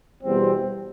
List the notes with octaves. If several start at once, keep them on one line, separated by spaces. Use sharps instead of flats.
E2 B2 G3 C4